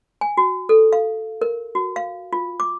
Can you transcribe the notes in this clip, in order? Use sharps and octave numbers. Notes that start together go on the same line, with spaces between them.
G#5
F#4
A4
F5
A#4
F#4
F5
F4
D6